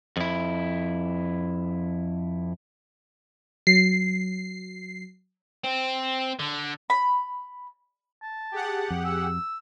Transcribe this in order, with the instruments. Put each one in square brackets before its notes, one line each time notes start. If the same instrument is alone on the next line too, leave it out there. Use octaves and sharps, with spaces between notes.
[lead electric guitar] F2 E4
[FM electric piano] F#3 [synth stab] C7
[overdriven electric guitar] C4
D3
[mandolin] B5
[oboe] A5
[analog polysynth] G4 G#4 F#5
[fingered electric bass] F2
[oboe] E6